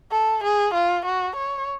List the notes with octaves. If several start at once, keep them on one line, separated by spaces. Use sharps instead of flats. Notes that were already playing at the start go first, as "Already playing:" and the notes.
A4
G#4
F4
F#4
C#5